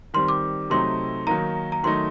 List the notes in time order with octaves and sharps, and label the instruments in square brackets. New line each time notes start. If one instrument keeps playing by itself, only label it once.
[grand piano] D#3 G3 C4 [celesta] C6
[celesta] D6
[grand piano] C3 F#3 A3 C4 D#4 [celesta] C6
[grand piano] D#3 F#3 A#3 D#4 [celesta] A#5
[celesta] A#5
[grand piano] D#3 F#3 A3 D#4 [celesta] C6